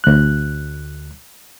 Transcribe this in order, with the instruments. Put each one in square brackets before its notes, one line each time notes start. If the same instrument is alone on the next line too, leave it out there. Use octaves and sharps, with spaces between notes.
[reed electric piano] D2 F#6